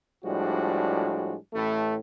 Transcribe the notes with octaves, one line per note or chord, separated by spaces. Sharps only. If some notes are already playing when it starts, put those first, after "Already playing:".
A2 F3 G3 G#3 D4 F#4
A1 A2 A3